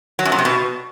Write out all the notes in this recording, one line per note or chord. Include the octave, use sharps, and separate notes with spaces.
F#3
F#2
A#2
C3
B2